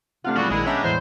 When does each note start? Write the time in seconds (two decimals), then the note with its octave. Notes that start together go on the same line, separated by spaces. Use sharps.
0.24 C3 A3 C4 D4 F4 F5 F#5
0.37 B1 G3 G#3 E4 F#4 G#4 D5 C#7
0.50 A#1 D#3 G#3 E4 G#4 B5 E6 C#7
0.66 B3 C#4 D4 G4 C#5 D5 E5 A#5
0.83 E2 A2 C5